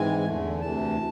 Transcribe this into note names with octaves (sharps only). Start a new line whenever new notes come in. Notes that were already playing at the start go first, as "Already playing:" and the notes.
Already playing: G#2 E3 G#3 C4 G#5
E2 D3 A3
D2 C3 E3 A5